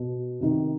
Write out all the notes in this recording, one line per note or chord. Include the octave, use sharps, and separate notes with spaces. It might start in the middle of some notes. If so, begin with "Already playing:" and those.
Already playing: B2
C3 D#3